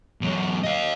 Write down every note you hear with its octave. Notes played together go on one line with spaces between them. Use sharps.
E2 F#3
D#5 F5